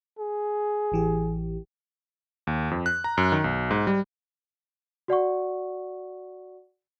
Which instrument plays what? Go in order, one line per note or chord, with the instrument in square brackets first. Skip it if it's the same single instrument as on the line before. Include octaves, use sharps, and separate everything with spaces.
[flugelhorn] G#4
[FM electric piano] A1 E3 G4
[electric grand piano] D#2
F2
F#6
A#5
F#2
D#3
B1
G#2
G3
[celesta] F#4 D5 F#5 C#6